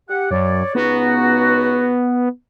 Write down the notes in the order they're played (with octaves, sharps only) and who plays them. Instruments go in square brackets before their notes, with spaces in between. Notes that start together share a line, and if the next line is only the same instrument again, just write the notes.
[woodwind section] G4 F#5
[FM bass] F#2 [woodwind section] C#5 D5
[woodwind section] C#2 D#4 F#4 [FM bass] B3